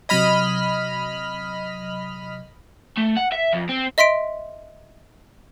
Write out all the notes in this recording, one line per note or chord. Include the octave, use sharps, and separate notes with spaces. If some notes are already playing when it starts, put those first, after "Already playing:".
C3 F#3 D#5 B5 F6 G#6
A3
F#5
E5
F2
C4
D#5 E5 C6 B6 D7